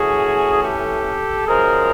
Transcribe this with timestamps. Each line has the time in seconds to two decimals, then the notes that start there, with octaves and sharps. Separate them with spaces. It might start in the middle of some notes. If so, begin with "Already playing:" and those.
Already playing: E3 A3 C#4 F#4 G#4
0.63 G4 A4
1.47 F#2 C#3 F3 G#3 G#4 A#4